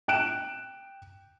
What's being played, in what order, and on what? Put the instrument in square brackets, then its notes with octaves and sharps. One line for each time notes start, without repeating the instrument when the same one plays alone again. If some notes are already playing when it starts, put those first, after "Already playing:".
[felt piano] G5 F#6 D7 E7